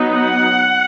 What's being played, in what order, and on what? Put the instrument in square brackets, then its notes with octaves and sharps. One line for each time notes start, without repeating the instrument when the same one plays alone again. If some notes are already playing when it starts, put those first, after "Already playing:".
Already playing: [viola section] F#3 B3 D#4
F#5